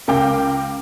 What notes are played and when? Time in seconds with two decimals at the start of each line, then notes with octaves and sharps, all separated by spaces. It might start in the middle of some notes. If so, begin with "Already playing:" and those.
0.08 C#2 A#4 F5 G5 D6